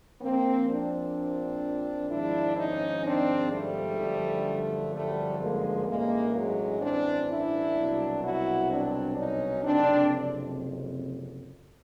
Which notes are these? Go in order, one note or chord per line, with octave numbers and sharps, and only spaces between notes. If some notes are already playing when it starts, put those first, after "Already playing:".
A#1 A#2 F3 A#3 C4
C4 D4
G#1 G#2 F3 D4 E4
C#4 D#4
C4 D4
G3 A3
G1 F#2 D3 F3
G3 A3
G#3 A#3
A1 G2 E3 G#3 A#3
F#3 G#3
C4 D4
D4 E4
C2 B2 F#3
E4 F#4
C4 D4
C#4 D#4
F#1 F2 C3 C4 D4